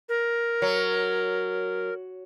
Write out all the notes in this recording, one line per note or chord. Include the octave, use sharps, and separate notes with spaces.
A#4
F#3